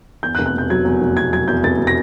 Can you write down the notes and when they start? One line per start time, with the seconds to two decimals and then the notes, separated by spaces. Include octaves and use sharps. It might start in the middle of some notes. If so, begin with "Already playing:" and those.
0.23 E2 G6
0.35 F#6
0.39 F1
0.46 F#6
0.54 B2 G6
0.70 F#3 G#6
0.85 E2
1.01 F1
1.17 B2 G#6
1.32 F#3 G#6
1.48 E2 G6
1.64 F1 A6
1.79 B2
1.87 A#6